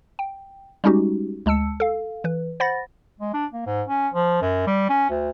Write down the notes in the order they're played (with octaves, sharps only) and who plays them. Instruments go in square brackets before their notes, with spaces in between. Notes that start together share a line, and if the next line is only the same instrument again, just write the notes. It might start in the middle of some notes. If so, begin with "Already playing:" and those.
[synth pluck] G5
G3 G#3 C#4 D#4 F#4 G4
D2 G#3 A5 E6 C#7
A4 F5
E3 B4
C5 F#5 B5 A6 A#6
[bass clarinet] G#3
D4
A#3
G#2
C#4
F3
F#2
G3
C#4
D2